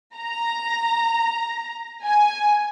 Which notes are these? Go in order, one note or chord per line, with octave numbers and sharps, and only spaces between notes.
A#5
G#5